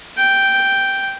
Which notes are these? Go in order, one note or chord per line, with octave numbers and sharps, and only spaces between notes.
G5